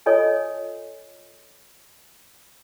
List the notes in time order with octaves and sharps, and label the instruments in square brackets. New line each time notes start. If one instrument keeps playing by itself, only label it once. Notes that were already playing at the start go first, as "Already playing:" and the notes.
[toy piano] F4 A4 C#5 D#5 G#5 C#6